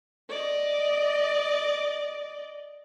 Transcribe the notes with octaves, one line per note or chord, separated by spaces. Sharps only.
D5 D#5